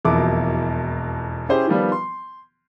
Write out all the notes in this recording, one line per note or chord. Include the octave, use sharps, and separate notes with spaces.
E1 F2 B2 A#3 E4 D6
C#4 E4 G4 G#4 C5
D#3 F3 G3 B3
C6